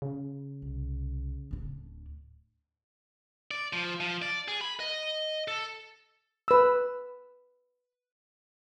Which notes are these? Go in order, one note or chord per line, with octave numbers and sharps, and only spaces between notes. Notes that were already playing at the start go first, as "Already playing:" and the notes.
C#3
C2
D1 D4
D5
F3
F3
D5
G#4
B5
D#5
A4
B4 E6